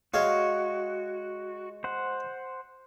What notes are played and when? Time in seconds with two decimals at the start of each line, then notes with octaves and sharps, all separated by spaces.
0.14 G#3 F#4 C#5 F5
1.84 C5 F#5